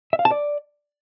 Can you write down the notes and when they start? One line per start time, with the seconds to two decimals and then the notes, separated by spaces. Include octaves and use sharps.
0.13 E5
0.19 F5
0.25 A5
0.31 D5